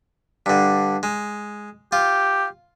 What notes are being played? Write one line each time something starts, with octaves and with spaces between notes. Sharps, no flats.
G2 D3
G#3
F4 G4